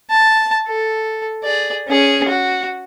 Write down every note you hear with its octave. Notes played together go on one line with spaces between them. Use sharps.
A5
A4
G#4 D5
C#4 G#4
F#4